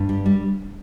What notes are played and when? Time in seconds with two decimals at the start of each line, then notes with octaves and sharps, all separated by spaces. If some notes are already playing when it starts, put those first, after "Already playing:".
Already playing: G2
0.09 G3
0.26 G3